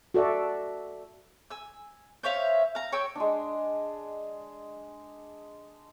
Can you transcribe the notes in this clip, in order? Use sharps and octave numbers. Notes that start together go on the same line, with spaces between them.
F#4 A4 D5 E5
G#5 E6
C5 C#5 E5 F5
F5 A#5
C#5 G5 E6
G#3 D4